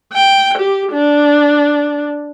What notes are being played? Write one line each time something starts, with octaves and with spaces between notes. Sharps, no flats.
G5
G4
D4